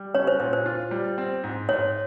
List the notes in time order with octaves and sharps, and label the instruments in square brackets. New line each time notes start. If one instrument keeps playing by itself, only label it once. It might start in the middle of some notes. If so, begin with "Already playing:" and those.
Already playing: [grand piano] G3
[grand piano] C#4 [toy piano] C#5
[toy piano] C5
[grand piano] A#2 [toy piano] C5
[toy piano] C5
[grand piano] F4
G3
C4
G#2
[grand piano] G#2 [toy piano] C#5